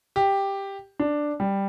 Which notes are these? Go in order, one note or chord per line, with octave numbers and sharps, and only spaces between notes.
G4
D4
G3